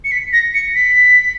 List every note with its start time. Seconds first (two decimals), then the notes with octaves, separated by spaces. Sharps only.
0.04 C#7
0.12 B6
0.33 A#6
0.54 C#7
0.75 B6